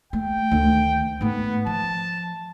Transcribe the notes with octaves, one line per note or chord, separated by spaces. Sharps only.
A3 G5
D2 D#3
G#2 A3 B3
F3 A5